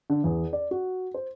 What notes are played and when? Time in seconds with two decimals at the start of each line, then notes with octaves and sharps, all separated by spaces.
0.10 D3
0.24 E2
0.53 D5
0.71 F#4
1.14 C5